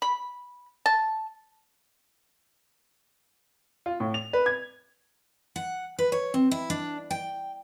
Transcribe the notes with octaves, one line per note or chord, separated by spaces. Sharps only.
B5
A5
F4
A2
F7
B4
G#6
F#5
B4
C#5
C4
E4
D4
G5